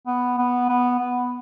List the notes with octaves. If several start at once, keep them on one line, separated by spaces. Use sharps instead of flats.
B3
B3
B3
B3